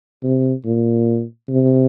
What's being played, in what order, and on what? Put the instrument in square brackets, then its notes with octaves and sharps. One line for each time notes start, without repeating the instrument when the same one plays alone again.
[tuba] C3
A#2
C3